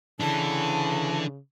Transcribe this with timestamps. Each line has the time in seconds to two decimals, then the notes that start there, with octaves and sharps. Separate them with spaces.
0.20 C#3 E3 D4 A4 A5